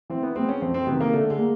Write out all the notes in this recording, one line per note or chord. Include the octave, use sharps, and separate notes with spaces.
E3 C4
B3
G#3 B3 C4
C#4
F2 C4
C4
C3 B3
D#3
A#3
D3 A3
G#3
A#3